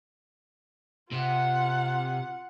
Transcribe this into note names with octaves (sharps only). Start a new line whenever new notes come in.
C3 F4 F#5